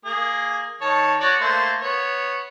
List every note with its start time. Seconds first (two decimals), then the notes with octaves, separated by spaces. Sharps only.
0.05 A#3 G#4
0.81 D#3 C#5 A5
1.20 F#4 C#5 D5
1.41 A3 A#3 C5
1.82 B3 C#5